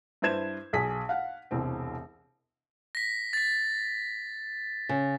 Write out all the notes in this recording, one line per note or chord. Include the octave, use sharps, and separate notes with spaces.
G2 E4 B4 C5 G#6 E7
B1 G#4 B6
F5 F#5
E1 C2 C4
A#6 B6
A6 B6
C#3